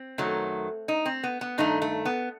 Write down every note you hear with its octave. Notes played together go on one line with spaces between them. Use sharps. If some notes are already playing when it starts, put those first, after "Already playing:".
Already playing: C4
F#2 D#3 F#3 A3
D#4
C4
B3
B3
G2 D#3 A3 D#4
A3
B3